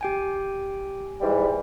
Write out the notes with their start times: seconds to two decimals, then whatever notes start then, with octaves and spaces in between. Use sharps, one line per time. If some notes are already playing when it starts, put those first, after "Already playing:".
0.01 G4 G5 G#5
1.21 G#2 E3 G3